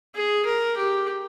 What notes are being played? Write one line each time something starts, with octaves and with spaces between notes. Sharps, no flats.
G#4
A#4
G4